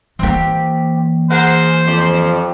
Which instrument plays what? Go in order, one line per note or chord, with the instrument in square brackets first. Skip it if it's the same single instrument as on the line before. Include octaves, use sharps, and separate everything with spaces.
[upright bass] E3 A#3 [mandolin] C4 G4
[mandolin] G#4 A#4 F#5 [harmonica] C5
[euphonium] F2 [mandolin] G4 D5